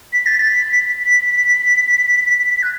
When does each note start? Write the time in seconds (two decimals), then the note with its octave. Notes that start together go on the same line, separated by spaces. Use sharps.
0.13 B6
0.26 A6
0.39 B6
0.77 B6
2.63 F#6